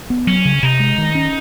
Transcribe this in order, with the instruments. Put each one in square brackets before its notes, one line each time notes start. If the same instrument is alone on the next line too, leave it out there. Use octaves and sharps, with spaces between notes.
[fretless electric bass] B3
[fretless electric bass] F#3 [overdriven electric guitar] C#4
[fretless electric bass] C#3
[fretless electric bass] C3 [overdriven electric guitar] D#4
[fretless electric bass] G#3
D#3
C#4